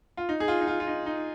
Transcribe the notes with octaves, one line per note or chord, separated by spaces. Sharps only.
F4
D#4
G#4
F4
D#4
F4
F4
D#4
D#4